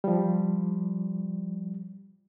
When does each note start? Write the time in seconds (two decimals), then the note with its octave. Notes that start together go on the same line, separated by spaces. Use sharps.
0.04 F3 G3